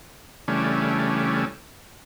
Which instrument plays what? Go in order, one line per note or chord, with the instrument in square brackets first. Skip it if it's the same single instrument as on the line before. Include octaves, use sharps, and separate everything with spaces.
[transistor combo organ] C#3 E3 G3 A3 C#4 D4